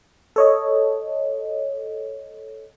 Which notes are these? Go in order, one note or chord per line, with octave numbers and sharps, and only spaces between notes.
A4 C#5 D#5